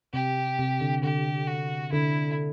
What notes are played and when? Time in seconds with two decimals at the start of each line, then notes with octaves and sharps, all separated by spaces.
0.13 C3 G4
0.59 C3
0.81 D3
1.03 D3 G4
1.47 F#4
1.92 D3 E4